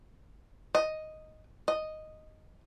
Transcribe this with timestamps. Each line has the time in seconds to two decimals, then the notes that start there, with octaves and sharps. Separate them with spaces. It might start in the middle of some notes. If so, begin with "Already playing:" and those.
0.75 D#5
1.68 D#5